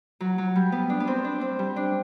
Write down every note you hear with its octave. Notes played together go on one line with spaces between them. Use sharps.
F#3
F#3
G3
B3
D4
B3
C4
D4
C4
G3
D4